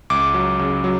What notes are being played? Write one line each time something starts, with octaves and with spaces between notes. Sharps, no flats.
C#2 D6
F#3
C#3
F#3